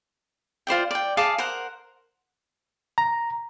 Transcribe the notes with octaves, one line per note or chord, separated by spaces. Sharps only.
F4 C5 D5 G5
D5 G5
G#4 F5 A5 D6
A#4 C5 F#5
A#5